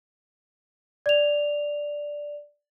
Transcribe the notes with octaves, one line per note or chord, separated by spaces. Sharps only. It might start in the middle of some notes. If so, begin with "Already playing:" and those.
D5 F7